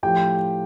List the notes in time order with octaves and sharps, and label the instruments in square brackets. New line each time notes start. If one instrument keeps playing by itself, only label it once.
[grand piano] A2 F3 G4 G5